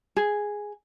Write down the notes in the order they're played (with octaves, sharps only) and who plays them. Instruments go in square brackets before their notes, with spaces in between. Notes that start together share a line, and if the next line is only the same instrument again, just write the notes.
[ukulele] G#4